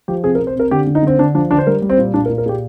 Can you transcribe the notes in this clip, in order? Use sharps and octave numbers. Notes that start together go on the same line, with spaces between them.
F3 G4
C3 G#4
A#4
C3
C5
C3 A#4
D3 G4
D3
D#4
D3 C4
D3 D4
F3 D4
D3 D4
C5
G3 A#4
G3
C4
A#2
A#2 D4
A#4
A#2
A#4
A#2 G4 G#4